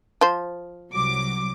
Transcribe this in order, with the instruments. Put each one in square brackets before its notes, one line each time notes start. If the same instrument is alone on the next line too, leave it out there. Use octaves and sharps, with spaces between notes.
[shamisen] F3 C5
[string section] C2 F#3 D6